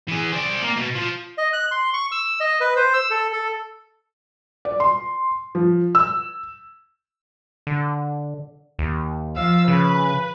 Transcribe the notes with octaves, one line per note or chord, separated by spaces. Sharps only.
E3 G#4
C4 D5
A#3
B2
F3
D#5
F#6
C6
C#6
E6
D#5
B4
C5
E6
A4
A4
D5
C6
F3
E6
D3
D#2
F3 F5 E6
C#3 B4